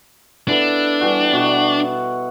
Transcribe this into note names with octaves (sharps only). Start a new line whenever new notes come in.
B3 D4 E4 A4
E3 G3 F#4
B2 F#4